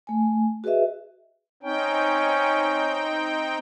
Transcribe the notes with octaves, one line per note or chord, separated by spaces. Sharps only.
A3 G#5
F#4 G#4 B4 D#5 E5
C4 C#4 D#4 G5